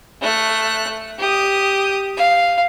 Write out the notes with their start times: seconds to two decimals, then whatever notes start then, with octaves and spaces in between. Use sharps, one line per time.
0.21 A3 F#6
1.19 G4 D#6
2.17 F5